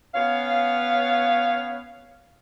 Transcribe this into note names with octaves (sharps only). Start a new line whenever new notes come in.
B3 C#4 C#5 F5